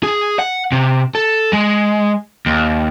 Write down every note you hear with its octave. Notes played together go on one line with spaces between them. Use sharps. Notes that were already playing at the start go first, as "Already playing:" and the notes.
G#4
F#5
C3
A4
G#3
D#2